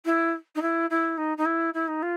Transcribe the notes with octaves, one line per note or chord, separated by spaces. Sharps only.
E4
D#4
E4
E4
D#4
D#4
E4
E4
D#4
F4